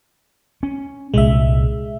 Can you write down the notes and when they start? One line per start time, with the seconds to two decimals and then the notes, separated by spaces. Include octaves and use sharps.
0.63 C#4
1.14 C2 A#2 G#3 E5